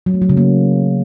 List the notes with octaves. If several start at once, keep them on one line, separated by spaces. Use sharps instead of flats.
F#3
A3
F#3
C#3
A#3